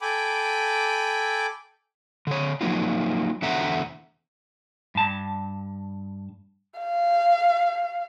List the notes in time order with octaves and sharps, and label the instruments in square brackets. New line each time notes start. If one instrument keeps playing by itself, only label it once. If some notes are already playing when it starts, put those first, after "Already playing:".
[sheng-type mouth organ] A4 G5 G#5 B5 D6
[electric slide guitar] D3 C#5
F3 F#3 A#3 D#4 F4
E2 B2 D3 E5 F#5 A#5
[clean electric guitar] G2 A5
[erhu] F5